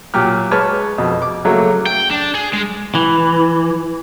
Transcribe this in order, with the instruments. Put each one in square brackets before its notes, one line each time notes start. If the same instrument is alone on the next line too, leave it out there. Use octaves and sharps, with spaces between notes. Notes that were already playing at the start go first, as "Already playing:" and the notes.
[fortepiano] A#2 F#3 G4 F6
G#3 B4 C#5 A5 F6
F2 B2
D6
C#3 F#3 A3 A#3
[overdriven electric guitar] G5
D4
G#4
G#3
[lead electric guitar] E3